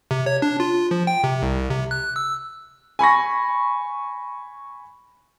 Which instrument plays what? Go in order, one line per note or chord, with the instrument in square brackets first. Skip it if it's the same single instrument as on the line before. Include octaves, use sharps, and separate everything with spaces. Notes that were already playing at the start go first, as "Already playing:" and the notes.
[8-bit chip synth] C3
C#5
D4
F4
F3
G5
C3
C2
C3
F#6
E6
[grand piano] G#5 B5 C#6 A#6